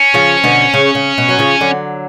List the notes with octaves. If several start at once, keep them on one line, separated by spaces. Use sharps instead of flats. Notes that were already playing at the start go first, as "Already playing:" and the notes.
Already playing: C#4
C#3 F3
B2 D3
C#3
C#3
B2
F#3
C#3 F3
D3 F#3